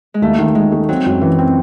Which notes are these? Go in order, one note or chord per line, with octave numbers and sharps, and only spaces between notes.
G#3
D#2 A3
D#3
D#3 G#3
A3
F#3 C4
F#2
E3
C4